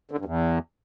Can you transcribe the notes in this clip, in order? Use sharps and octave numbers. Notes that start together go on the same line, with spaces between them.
D3
G2
E2